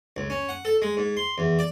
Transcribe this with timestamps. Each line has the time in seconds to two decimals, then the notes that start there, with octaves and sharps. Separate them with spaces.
0.17 C#2
0.30 C#4
0.49 F#5
0.65 A4
0.82 G#3
0.97 G#2
1.17 C6
1.38 E2
1.59 D5